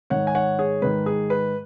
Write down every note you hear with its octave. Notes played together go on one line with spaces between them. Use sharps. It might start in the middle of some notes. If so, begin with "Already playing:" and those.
G#2 D#3 C#5 F#5
G#5
C#5 F#5
G#4 C#5
G#2 D#3 B4
G#4
B4